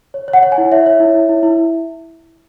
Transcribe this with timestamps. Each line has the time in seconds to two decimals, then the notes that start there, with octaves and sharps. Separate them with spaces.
0.14 C#5
0.28 C#5
0.33 F#5
0.43 C#5
0.52 G#5
0.58 E4
0.72 C#5 E5
0.86 C#5
1.00 E4
1.14 E4
1.29 E4
1.43 E4